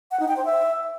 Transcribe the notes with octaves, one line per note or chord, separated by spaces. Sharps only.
F#5
D#4
G5
C5
E5